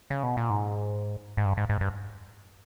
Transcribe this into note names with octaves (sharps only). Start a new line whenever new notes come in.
C#3
B2
A#2
G#2
G#2
G2
G#2
G#2
G2